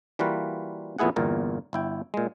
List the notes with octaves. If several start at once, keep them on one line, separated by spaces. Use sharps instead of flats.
E3 G3 A#3 F4 F#4 B4
F2 A#2 B3 E4 G#4 F#5
G1 E2 A#2 A#4
G1 E4 G5
A#2 G#3